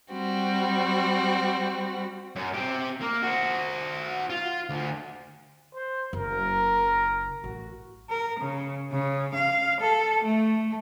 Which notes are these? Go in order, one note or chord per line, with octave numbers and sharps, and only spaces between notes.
G3 C4 F#4
F#2
C4 G4
A#3
F#4 C5
F4
D2
C5
F#1 A#4
A1 F#4
A#4
C#3
C#3
F5
A4
A3